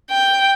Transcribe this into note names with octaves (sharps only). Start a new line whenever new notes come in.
G5